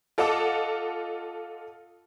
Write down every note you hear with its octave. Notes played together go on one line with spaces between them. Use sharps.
F4 A4 D#5 F#5 A5 D6